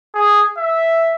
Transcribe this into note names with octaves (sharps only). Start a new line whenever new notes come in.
G#4
E5